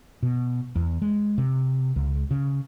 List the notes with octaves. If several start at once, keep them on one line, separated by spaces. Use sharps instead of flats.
B2
E2
G#3
C3
C#2
C#3